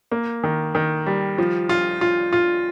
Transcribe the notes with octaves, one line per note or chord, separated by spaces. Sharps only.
A#3
D#3
D#3
G3
F3
F4
F4
F4